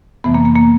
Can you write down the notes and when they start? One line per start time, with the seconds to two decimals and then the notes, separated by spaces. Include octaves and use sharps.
0.24 F2 C3 E3 A3 B3
0.34 A#3
0.45 A#3
0.56 A#3